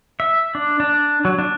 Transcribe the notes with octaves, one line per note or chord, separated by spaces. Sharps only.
E5
D4
D4
F#3
D4